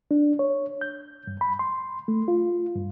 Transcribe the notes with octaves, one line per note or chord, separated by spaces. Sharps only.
D4
C#5
G6
G2
B5
C6
A3
F4
G2